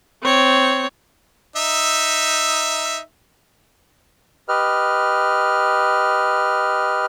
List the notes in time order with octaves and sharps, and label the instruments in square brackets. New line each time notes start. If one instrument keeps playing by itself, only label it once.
[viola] C4 C#5
[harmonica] D#4 E5
[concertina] G4 B4 D#5 F6